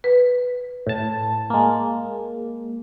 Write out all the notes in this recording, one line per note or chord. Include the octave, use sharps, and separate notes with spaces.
B4
A2 A5
G#3 A#3